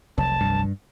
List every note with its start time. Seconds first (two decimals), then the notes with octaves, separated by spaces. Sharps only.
0.18 F1 C2 F#3 A5
0.41 G2